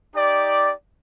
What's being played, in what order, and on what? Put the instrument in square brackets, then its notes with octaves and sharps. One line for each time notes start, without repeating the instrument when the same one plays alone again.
[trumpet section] D#4 G4 D5